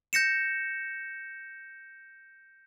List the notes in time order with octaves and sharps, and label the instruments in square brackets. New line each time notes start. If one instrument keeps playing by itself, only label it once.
[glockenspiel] G6 A#6 C#7 E7